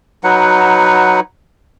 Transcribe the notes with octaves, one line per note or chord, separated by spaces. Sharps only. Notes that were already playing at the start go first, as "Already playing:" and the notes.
F#3 D#4 B4 F#5